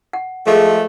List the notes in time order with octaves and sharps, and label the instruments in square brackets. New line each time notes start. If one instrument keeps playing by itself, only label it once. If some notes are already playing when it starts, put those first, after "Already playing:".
[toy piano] F#5
[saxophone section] F3 G#3 A3 [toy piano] G#4 A#4